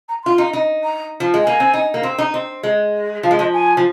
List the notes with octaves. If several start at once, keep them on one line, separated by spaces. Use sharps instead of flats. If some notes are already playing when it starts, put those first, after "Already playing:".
A#5
F4 C6
D#4
D#4
A#5
F3
G#3
A#3 G#5
C4
D#4
A#3
C4
D#4
C4
G#3
F3 F5
G#3
F3 D#5
G#5
F3